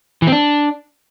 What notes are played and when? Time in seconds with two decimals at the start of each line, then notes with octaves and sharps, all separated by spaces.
0.22 E3
0.27 C4
0.32 D4